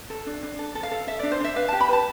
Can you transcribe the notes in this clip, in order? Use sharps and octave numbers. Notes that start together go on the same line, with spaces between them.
A4
D4
D4
A4
A4
F5
A4
A4 E5
D4 D5
C5
D4 E5
B4 F5
G4 A5
B5
B4 A5